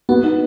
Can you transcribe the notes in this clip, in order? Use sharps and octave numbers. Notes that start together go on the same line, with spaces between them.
B3 F#4
D#4